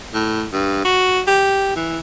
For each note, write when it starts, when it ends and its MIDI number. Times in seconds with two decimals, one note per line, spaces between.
0.13 0.45 45
0.52 0.80 43
0.84 1.21 66
1.27 1.72 67
1.76 1.99 52